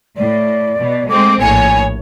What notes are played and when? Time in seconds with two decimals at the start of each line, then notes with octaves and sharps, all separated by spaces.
0.17 A2 D5
0.79 B2
1.09 G#3 A3 C4 D6
1.40 A#1 A2 C#5 G#5